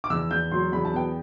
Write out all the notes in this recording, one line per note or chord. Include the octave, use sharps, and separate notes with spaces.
D6
E2 E6
E2 G6
F#3 C6
E2 B5
A5
B3 G5